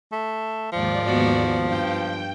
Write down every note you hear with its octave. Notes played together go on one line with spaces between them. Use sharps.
A3
D#2 G#2 F3 D5
B3 F#4
G2 G5